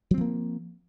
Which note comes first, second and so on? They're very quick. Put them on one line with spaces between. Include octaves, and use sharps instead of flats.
F#3 C4 F3 A#3